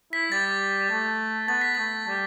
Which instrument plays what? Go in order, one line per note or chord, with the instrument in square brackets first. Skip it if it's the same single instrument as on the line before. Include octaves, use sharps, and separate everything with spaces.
[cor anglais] E4 [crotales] B6
[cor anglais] G3 [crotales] A6
[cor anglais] A3
[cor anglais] B3 [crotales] A6
[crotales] B6
[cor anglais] A3 [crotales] A6
[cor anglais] G3